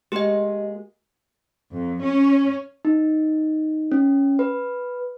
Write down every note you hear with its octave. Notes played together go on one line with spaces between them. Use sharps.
G#3 A#3 F#4 G4 D#5
F2
C#4
D#4
C#4
B4